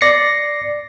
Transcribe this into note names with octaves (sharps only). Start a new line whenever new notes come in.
D5 A#6 C7 C#7